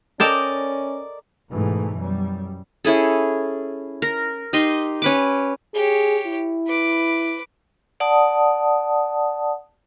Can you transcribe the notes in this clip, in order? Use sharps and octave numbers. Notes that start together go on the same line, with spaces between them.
C#4 A4 A#4 D5 D#5 G5 A5
G#2 B2 E3 A3
F#2 G3
C#4 E4 G#4 A4
A#4
D#4 G4 D#5 C6
C#4 B4 D6
G4 G#4 C#5
E4
B4 D6
D5 F#5 A5 D#6